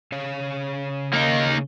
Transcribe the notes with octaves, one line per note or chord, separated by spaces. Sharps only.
C#3 C#5 F5
A#3 D#4